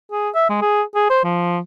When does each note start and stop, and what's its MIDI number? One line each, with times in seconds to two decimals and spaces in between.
0.12 0.29 68
0.34 0.48 76
0.49 0.57 56
0.61 0.82 68
0.95 1.05 68
1.09 1.20 72
1.24 1.58 53